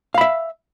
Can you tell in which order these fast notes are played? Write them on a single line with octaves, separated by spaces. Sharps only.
F5 B5 E5